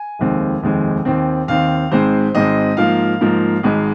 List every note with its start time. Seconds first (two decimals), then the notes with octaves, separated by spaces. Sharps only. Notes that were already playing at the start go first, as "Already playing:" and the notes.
Already playing: G#5
0.19 F1 D#2 D#3 G#3 C4
0.63 F1 D#2 D#3 G#3 C4
1.05 D#2 D#3 C4
1.48 D#2 D#3 C4 F5
1.91 G#1 G#2 G#3 C4 C5
2.35 G#1 G#2 G#3 C4 D#5
2.77 G#2 F3 A#3 F5
3.21 G#2 F3 A#3
3.63 G#1 G#2 G#3